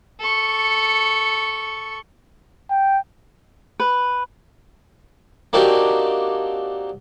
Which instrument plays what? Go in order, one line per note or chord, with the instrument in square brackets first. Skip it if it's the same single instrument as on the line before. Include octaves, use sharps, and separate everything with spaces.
[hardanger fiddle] A4 C#6
[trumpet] G5
[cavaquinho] B4
[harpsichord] A#3 C4 D4 D#4 F#4 G4